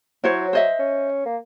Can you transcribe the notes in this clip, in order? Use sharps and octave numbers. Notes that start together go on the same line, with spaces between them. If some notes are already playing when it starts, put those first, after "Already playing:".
F#3 E4 C5 C#5
C5 D#5 E5
C#4
A#3